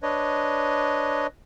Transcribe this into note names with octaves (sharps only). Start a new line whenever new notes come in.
D4 B4 C#5 D#5